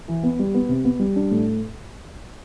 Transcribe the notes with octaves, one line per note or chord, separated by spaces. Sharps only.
E3
B3
G3
B3
C3
B3
G3
D4
A2